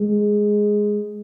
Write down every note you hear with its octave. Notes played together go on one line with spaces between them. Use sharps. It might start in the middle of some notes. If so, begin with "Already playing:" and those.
Already playing: G#3